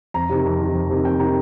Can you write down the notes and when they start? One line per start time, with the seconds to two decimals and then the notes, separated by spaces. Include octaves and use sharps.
0.14 F2 A#5
0.30 C3 D#3
0.45 F2
0.60 C3 D#3
0.74 F2
0.90 C3 D#3
1.04 F2 G5
1.19 C3 D#3 A#5